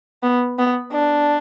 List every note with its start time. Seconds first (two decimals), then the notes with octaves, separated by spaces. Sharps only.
0.23 B3
0.59 B3
0.93 D4